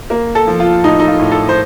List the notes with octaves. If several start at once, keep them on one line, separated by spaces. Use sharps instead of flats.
A#3
A4
F3
F4
A2 D#4
D#4
F4
A2
A4
C5